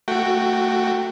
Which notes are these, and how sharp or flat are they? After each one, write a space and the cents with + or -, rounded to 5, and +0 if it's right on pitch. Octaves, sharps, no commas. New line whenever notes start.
A3 +25 F#4 +0 G5 +0